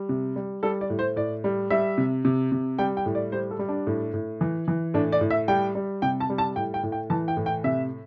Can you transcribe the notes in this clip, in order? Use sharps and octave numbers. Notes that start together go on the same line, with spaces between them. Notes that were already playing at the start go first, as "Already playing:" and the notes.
Already playing: G3
C3
G3
G3 A4
D5
A2
C5
A2 D5
G3
G3 E5
C3
C3
C3
G3 G5
G5
A2
D5
G3 C5
A4
G3
D4
A2
A2
E3
E3
A2 D4
D5
A2
E5
G3 G5
G3
C3 G5
A5
G3
A5
A2 G5
G5
A2
G5
E3 A5
G5
A2
G5
C3 E5